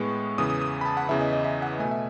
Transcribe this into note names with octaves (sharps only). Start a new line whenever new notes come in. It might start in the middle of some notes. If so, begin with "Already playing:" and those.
Already playing: A2 G#3 B3 C#6
E2 C#3 E3 D#6
D#6
D#6
B5
A5
F#5
E2 C#3 E3 E5
D#5
D#5
E5
F#5
B2 A3 G#5
E5